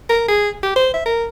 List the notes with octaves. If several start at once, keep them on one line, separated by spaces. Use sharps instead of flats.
A#4
G#4
G4
C5
E5
A#4